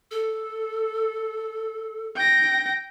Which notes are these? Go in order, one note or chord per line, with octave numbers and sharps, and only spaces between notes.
A4
G5 A#6